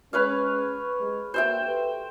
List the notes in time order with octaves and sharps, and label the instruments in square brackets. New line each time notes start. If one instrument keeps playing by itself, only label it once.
[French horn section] G#3 C#4 [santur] B4 C#5 F5
[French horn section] G#3
[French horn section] A#3 D4 F#4 [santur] C5 E5 G5
[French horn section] G4 A4 B4